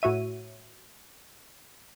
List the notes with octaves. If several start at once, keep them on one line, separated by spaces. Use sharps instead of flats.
A2 F#4 C#5 E5 D#7